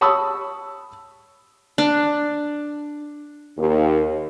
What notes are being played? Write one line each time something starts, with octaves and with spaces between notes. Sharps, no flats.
C#5 A5 B5 C#6 D#6 E6
D4
D#2